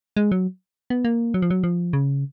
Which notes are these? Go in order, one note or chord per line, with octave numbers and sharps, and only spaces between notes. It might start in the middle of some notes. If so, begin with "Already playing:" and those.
G#3
F#3
B3
A#3
F#3
F3
F#3
F3
C#3